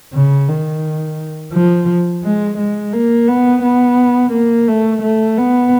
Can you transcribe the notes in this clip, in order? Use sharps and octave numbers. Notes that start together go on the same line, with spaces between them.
C#3
D#3
F3
G#3
G#3
A#3
B3
B3
A#3
A3
A3
B3